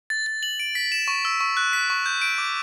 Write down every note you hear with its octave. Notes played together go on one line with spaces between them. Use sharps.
A6
A6
F#7
D7
B6
E7
C#6
E6
C#6
F#6
B6
C#6
G6
D7
D6